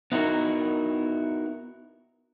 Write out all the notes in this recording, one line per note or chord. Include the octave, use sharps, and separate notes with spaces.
B3 D#4 E4 F#4 A#4